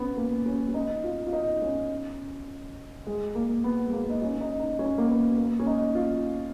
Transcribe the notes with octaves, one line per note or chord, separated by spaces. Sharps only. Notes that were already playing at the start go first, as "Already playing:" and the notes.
Already playing: B3 C#4
A#3
C#4
C#4
D#4
F4
F4
D#4
C#4
G#3
A#3
B3
G#3
A#3
D#4
C#4
D#4
D#4
C#4
A#3
B3
A#3
C#4
D#4
F4